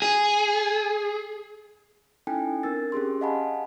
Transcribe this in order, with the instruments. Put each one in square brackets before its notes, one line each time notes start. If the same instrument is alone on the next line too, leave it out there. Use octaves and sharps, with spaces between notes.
[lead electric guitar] G#4
[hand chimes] C#4 D#4 E4 A4 G5 G#5
C4 D4 A#4 E6 A6
C#4 G4 G#4 C6
D#5 F5 F#5 G#5 A5 B5